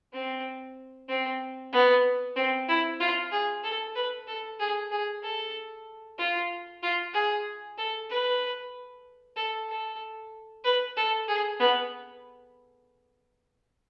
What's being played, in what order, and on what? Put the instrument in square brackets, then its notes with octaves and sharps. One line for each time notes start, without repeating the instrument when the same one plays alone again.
[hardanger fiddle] C4
C4
B3
C4
E4
F4
G#4
A4
B4
A4
G#4
G#4
A4
F4
F4
G#4
A4
B4
A4
A4
B4
A4
G#4
B3